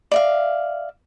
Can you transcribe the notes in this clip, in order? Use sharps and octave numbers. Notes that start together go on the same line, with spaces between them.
D5 E5 F5